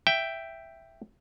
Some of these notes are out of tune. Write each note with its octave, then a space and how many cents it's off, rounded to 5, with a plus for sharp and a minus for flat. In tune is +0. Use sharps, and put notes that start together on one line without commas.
E5 +5 G5 +0